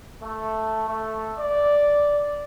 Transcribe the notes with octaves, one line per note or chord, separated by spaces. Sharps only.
A3
A3
D5